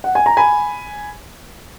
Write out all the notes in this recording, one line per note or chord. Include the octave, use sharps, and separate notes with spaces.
F#5
G#5
A#5
G#5 B5